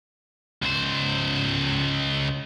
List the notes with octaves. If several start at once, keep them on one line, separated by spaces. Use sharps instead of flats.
C#2 C5